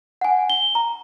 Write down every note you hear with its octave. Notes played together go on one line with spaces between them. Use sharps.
F#5 G#5
G7
A#5